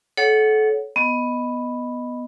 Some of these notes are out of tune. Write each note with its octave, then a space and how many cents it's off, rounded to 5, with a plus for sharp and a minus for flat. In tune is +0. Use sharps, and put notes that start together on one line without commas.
A4 -30 C#5 +0 F#5 +0
B3 +0 D#5 +0